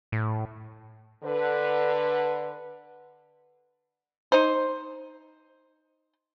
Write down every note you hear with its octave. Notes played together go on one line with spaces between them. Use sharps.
A2
D3 B4
D#4 C5